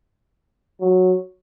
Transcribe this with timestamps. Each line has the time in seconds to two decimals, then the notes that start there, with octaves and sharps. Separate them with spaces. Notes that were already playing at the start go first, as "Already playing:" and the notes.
0.81 F#3